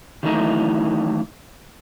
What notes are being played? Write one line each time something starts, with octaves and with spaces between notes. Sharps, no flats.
D#3 E3 F#3 A3 D#4 E4